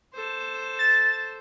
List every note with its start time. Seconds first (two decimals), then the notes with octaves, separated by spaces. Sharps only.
0.14 A4 C5
0.79 A6